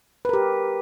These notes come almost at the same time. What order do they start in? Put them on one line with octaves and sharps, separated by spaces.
B4 A#4 G4